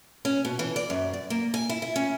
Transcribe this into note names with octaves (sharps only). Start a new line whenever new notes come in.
C#4
B2
E3
D5
F#2
D5
A#3
G#5
E4
E4
C#4